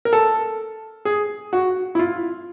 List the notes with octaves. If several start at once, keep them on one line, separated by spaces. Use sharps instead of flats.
A#4
A4
G#4
F#4
E4
F4